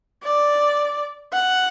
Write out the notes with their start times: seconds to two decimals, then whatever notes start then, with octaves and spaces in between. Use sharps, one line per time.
0.23 D5
1.33 F#5